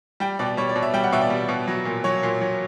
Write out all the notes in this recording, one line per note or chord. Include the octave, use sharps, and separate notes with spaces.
G3 G5
B2 D5
G3 C#5
D5
B2
E5
G3 G5
F#5
B2 E5
D5
G3
B2
F#3
A#2
F#3 C#5
A#2
F#3